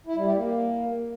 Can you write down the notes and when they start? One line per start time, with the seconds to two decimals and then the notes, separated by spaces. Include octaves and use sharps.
0.07 E4
0.16 G3
0.26 G4
0.36 A#3